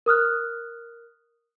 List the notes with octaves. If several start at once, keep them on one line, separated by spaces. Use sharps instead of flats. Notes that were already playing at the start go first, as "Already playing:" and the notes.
A#4 D#6 F6 F#6